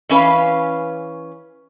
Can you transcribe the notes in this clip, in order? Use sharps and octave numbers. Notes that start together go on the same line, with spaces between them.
E3 C#4 B4 F5